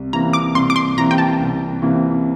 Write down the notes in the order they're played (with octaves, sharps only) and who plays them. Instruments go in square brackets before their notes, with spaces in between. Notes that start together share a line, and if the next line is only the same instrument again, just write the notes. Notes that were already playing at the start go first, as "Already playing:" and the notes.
Already playing: [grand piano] C2
[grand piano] C3 E3 A#3 [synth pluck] A#5
[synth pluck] D6
[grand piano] C2 [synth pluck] C6
[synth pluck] D6
C6
[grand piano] C3 E3 A#3 [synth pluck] A#5
[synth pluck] G5
A5
[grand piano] C2
C3 E3 A#3